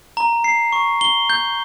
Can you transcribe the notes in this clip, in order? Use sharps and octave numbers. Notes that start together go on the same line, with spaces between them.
A#5
C7
C#6
G7
G6